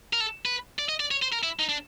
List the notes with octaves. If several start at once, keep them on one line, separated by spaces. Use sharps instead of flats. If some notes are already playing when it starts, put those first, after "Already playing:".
A#4
A4
B4
D5
D#5
D5
C#5
C5
A#4
E4
D#4
D4